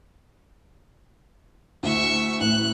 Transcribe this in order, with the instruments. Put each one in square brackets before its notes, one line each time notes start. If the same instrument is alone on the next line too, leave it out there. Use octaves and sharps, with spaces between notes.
[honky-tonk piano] D2 E4 [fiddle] E5 C#6
[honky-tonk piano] A1 A2 [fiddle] F#6